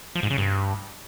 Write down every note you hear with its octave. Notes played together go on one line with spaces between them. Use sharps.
F3
G#2
C#3
G2